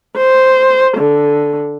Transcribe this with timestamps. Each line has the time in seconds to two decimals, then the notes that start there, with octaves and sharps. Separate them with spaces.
0.17 C5
0.98 D3